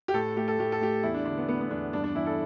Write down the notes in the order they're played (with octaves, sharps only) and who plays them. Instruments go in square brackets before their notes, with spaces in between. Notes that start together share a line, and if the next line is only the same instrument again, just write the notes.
[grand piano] G4
A2 A4
A3 G4
A4
A2 G4
A4
A3 G4
E2 E4
D4
D3 D4
B3
A3 B3
B3
E2 D4
G2 D4
D4
E3 E4
A4